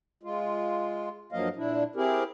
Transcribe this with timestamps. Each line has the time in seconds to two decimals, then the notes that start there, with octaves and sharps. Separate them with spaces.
0.23 G#3 F4
1.32 G2 F3 F#3 A#3 D#5 F5
1.56 A#2 D4 E4
1.96 C4 E4 G4 G#4 A#4